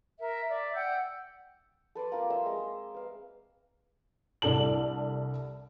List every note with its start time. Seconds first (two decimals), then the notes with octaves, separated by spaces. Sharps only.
0.19 A#4 E5
0.48 D5 E5
0.75 F#5 G5 E6 G6
1.95 A4 B4 C6 D6
2.12 A#3 C4 F4
2.30 E5 C6 E6
2.46 G#3
2.95 B4 F5
4.42 C2 D4 A4 A5 F#7